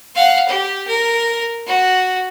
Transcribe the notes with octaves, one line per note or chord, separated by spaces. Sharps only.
F5 F#5
G4
A#4
F#4